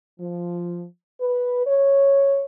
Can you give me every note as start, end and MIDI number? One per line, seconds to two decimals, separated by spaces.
0.20 0.85 53
1.20 1.65 71
1.66 2.45 73